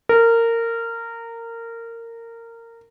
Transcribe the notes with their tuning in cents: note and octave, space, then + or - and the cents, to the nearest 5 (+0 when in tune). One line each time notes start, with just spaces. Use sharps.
A#4 -20